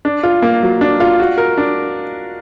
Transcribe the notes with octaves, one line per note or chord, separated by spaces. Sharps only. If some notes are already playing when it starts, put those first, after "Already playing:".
D4
F4
A#3
F#3
D4
F4
F#4
A#4
D4